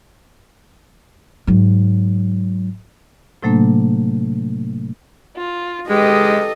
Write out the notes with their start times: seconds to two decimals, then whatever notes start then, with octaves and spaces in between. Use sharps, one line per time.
1.47 G#2 F#3
3.43 A2 C3 F#3 A3 A#3 D4
5.37 F4
5.90 G#3 G4 A4 B4 D#5